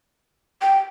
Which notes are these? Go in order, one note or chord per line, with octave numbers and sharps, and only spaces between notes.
G5